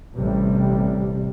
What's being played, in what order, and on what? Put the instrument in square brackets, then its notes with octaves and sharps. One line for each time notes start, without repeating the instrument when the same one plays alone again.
[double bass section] A1 C3 G3